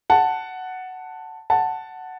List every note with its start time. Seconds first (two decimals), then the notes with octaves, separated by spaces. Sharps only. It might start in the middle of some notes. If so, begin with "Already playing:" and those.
0.10 F#5 A5
1.50 F#5 A5